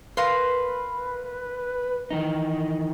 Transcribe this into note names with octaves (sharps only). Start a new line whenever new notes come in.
A#4 B4 F5 C6
D#3 E3 D#4